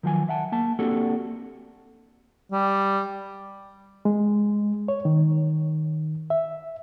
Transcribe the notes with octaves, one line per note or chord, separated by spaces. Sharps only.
D#3 F3 F#3 G#5
E5 F#5 A5
A#3 A5
A#3 C4 D4 F#4 G4 A4
G3
G#3
C#5
D#3
E5